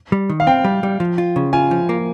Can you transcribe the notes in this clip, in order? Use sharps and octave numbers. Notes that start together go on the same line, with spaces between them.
G3
D#3
F5
C4 G5
G3
G3
F3
F4
C#3
F4 G#5
F3
A#3